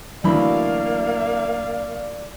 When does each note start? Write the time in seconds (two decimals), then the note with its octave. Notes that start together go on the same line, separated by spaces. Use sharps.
0.24 D2 E3 F#3 A#3 D5 F5 B5